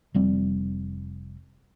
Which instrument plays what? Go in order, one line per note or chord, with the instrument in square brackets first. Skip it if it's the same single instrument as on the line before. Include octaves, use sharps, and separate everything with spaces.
[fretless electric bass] F1 F2 G3 C4